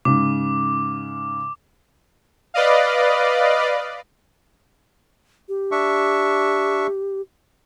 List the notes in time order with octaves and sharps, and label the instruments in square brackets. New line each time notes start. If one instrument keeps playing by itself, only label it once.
[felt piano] G#2 C#3 [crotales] D6
[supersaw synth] B4 D5 D#5 F5
[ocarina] G4
[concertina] D4 E5 C#6